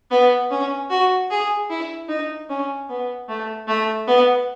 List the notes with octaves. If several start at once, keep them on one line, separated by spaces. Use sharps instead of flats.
B3
C#4
F#4
G#4
E4
D#4
C#4
B3
A3
A3
B3